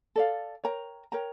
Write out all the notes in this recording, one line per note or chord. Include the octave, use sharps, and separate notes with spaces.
A4 D5 F5
A#4 C#5 G5 A#5
A#4 C#5 G5 A#5